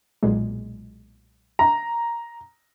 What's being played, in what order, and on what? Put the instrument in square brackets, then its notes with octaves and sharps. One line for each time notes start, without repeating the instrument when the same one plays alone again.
[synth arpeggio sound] B1 A#2 G#3
[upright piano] A#5